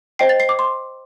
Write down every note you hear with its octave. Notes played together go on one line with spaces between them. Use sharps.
C5 D#5 G5 C7
A6
C7
D6
C6